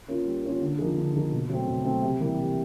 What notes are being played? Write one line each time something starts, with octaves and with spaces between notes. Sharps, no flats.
A#3 C#4 F4
G3
A#3 C#4 F4
D3
F3 A#3 D#4 G#4
D3
F3 A#3 D#4 G#4
B2
F#3 A3 C4
B2
F#3 A3 C4
C3
E3 G3 A#3
C3